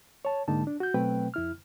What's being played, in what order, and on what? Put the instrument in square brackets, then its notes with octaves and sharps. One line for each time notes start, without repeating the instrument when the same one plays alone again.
[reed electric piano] C#5 A5
G#2 D3 G#3 A#3 D#4 A5
D4
F#4 G6
B2 F#3 A3 C4 B4 G5
F2 E4 F6